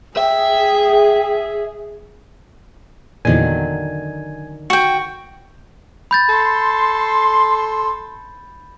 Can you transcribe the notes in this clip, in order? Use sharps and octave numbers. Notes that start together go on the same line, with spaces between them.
G#4 E5 G5
E2 A#2 D3 D#3 F#3 G#5
F#4 G5 C#6
B5 G6 A6
A4 C6